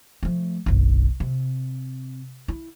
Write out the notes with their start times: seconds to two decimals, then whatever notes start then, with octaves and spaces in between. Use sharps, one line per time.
0.23 F3 A3
0.66 F#1 B1
1.20 C3
2.48 E4